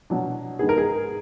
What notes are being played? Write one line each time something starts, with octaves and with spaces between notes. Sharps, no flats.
B2 F#3 D4
G#2 D#3 G#3 B3 G#4
A#4
G#4